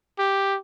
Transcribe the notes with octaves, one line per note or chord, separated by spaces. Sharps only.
G4